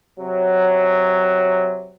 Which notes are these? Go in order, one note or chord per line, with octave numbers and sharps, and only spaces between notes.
C3 F#3